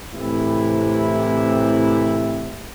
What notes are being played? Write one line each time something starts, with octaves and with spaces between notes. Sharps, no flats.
A2 C3 E3 C4 E4